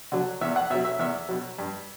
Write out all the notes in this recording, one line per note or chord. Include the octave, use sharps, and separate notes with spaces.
D3 F#3
E2 E5
F#5
B2 F#3 E5
E5
E2 E5
B2 F#3
G2